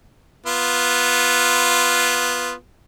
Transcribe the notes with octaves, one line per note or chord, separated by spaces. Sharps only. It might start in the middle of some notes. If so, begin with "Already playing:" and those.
B3 F4